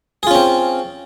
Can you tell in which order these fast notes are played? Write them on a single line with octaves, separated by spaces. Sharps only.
G#4 F4 C#4 C4